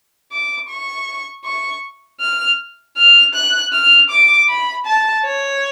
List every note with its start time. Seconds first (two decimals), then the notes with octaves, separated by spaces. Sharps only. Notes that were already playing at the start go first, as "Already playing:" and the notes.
0.31 D6
0.69 C#6
1.45 C#6
2.21 F6
2.97 F6
3.34 F#6
3.73 F6
4.10 D6
4.49 B5
4.86 A5
5.25 C#5